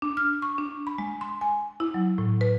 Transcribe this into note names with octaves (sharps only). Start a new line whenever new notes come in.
D4
F6
C#6
D4
B5
G#3
C6
G#5
E4
F#3
A2
B4